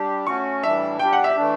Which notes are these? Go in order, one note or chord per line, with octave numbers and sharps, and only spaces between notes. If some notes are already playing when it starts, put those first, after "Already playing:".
Already playing: G3 D4 G4
A3 C#4 F#4 C#6
A2 E3 G3 D4 E5
G3 D4 G4 G5
F#5
E5
E3 A3 D4